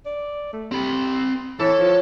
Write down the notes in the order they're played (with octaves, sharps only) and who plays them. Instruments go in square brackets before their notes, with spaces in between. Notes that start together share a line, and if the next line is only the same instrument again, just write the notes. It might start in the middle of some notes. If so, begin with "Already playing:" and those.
[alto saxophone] D5
A3
[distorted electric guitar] C4 B5 [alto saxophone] G4
[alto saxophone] E3 [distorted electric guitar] A4 [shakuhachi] C#5
[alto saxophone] F3